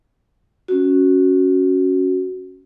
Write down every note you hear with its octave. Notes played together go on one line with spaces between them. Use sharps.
C#4 F#4